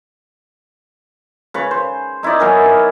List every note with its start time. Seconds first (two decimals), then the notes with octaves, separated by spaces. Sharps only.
1.54 C#3 B4 C#5
1.71 C5
2.23 D#4 E4 C#5 D5
2.39 F#3 B3 A#4 G#5